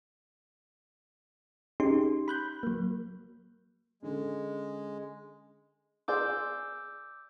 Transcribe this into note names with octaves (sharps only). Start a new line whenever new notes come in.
C#4 D#4 G4 G#4 C6
B5 F#6 G6
F#3 A#3
D3 G#3 C#4
G#4 D5 C6 D6 E6 G6